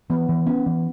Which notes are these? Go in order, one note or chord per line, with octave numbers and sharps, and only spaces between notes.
E3 B3
E3
B3 C#4
E3